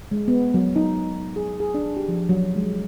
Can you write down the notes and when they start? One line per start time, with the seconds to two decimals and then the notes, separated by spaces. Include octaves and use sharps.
0.11 G#3
0.28 B3
0.54 F#3
0.76 D#4
1.36 G#4
1.60 G#4
1.74 D4
1.97 G4
2.08 F3
2.29 F#3
2.56 G#3